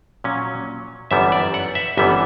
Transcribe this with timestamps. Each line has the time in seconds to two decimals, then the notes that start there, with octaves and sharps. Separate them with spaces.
0.24 A#2 F#3 C#4
1.11 G1 F#2 E3 G3 B3 E5
1.32 D5
1.54 F#5
1.75 E5
1.97 G1 F#2 E3 G3 B3 E5